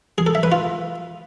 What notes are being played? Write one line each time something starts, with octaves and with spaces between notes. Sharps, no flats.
G#4
A4
E5
B4
F4